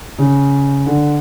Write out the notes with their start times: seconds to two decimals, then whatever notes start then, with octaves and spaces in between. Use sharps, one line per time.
0.19 C#3
0.86 D3